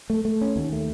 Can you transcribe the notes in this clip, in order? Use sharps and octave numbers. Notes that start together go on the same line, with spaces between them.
A3
A3
C#4
D#2
A3